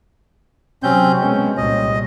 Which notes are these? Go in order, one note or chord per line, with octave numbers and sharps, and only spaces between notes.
C3 F#3 C4 C#4 G6
B2 G#3 C#4
C2 A#2 D#5